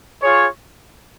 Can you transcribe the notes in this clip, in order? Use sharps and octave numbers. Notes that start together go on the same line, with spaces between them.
F4 G#4 C#5